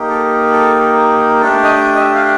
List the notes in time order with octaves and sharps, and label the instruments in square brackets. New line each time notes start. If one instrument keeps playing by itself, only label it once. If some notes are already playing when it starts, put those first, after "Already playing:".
Already playing: [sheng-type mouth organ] A#3 D#4 G4
A4
A4
A3 D4 G4 A4
D#5
D#5
E5
F5